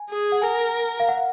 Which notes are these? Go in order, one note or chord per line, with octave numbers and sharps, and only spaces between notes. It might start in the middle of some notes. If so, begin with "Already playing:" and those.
Already playing: G#5
G#4
F#5
A#4 G#5
F5
F#5